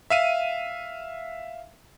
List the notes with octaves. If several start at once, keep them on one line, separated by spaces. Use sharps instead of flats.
E5 F5 D#7